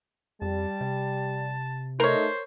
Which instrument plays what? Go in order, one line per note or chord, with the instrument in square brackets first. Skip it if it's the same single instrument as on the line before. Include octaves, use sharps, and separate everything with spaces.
[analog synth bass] F2 [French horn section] G3 [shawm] A5
[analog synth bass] C3
[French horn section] A3 D#4 [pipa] A#4 C#5 [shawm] C5